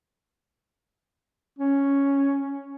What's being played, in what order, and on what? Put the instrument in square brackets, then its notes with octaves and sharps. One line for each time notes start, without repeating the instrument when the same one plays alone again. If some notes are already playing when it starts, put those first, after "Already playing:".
[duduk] C#4